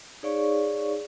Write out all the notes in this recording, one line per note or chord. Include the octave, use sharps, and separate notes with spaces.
D#4 G#4 C#5 D5 F5 C#6